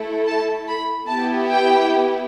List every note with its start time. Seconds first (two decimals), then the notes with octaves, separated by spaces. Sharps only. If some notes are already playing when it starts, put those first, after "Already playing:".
Already playing: A3 E4 A4
0.27 A5
0.68 B5
1.08 B3 E4 G4 A5
1.48 G5